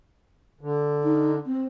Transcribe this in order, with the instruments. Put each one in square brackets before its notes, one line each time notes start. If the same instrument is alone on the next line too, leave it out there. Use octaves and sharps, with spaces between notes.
[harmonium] D3
[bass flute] D#4
C4